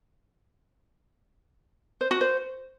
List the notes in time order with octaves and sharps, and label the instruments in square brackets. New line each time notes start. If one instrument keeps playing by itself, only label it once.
[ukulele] C5
F#4
C5